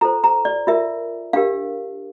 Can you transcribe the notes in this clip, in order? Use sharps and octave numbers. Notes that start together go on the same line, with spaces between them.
F4 A4 C5 A#5
A#5
D5
F4 A#4 E5
D4 G4 A#4 F5